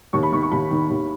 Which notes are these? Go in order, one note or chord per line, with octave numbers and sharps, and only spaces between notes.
D#2 C#6
B5
D#3 C#6
C#6
D#2 B5
D#3
D#2